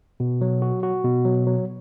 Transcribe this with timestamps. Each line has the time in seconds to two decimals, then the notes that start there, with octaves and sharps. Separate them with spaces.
0.20 B2
0.41 F#3
0.62 F#4
0.83 F#4
1.04 B2
1.25 F#3
1.47 F#3